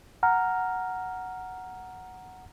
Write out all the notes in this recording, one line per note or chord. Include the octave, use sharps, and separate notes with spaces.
F#5 A#5 F6